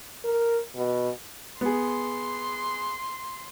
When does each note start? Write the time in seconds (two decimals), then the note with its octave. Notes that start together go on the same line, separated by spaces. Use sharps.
0.24 A#4
0.77 B2
1.61 B3 G#4 C6